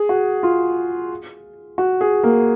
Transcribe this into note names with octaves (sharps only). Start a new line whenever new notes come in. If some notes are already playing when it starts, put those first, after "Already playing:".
Already playing: G#4
F#4
F4
F#4
G#4
A#3